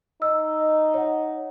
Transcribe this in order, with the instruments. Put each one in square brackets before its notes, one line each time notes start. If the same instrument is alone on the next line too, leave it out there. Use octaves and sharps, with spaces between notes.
[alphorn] D#4 [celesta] D#5 E6
[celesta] C#5 F#5